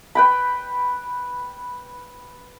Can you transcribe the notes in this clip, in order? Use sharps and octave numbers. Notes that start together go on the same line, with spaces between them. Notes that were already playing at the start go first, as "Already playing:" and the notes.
B4 G5 B5